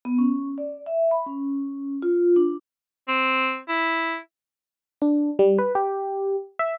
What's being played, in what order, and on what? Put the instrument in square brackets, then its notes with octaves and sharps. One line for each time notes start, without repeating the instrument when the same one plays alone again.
[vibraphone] B3
C#4
D5
E5
B5
C#4
F4
D4
[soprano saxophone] C4
E4
[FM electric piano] D4
G3
B4
G4
E5